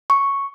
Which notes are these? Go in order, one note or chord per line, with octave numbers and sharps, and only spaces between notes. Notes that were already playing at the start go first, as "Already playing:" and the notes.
C#6